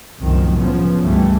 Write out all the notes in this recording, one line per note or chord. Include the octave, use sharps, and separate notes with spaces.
C2 F#2 A2 D#3 F3
C#3 F3 B3
C#2 G2 E3 G3 A3